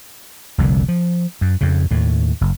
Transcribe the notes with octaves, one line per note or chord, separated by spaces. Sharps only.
F1 C2 A#2 D3
F3
F#2
F2 C#3
D#2 A2
F#1